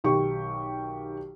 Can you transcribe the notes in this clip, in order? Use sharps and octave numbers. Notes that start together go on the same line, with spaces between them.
B1 D#3 G4 C#6